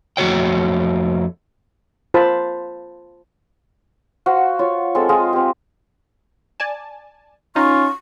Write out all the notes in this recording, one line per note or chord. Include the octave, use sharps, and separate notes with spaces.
F2 A3 F#4 C#5 G5
F4 C5 A5 B5
F#4 C5 F5
F4 C#5
G#3 C4 A4 A5
F4 G#4 D#5
C4 G4
D5 G#5 A5
C#4 D#4 F4 C#6